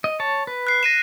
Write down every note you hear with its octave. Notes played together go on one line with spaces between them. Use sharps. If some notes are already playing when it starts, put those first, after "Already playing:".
D#5
C#5 A5
B4
F#6 C7
A#6 D#7 E7